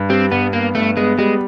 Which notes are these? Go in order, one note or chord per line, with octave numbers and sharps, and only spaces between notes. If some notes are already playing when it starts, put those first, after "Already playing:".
Already playing: G2
G3 C4
G2 B3
A#3 B3
G2 A3
G#3 B3
G3 G#3